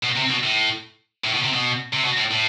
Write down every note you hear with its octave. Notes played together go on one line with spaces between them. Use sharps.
B2
C3
B2
A2
A2
B2
C3
B2
C3
B2
A2
A2